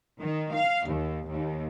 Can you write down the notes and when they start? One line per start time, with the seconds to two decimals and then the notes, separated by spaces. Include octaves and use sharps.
0.21 D#3
0.55 F5
0.88 D#2
1.29 D#2